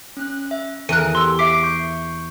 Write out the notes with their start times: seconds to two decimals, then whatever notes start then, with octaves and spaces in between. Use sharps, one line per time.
0.17 C#4 F#6
0.51 E5
0.89 E2 A4 A#4 F#6 D#7
1.15 G4 C6 E6
1.39 E5 D6 B6 C7 D7
1.63 C#6 G6